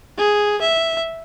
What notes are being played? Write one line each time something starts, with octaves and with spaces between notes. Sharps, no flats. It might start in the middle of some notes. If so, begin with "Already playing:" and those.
G#4
E5